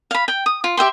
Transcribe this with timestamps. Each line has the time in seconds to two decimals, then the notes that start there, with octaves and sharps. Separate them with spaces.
0.11 F5 B5
0.28 G5
0.46 D#6
0.64 F4
0.77 G4 E5 G5 C6